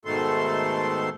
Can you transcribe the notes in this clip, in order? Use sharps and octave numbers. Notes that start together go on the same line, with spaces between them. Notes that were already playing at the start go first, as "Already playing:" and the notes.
G#2 B2 D#3 A3 A4 C6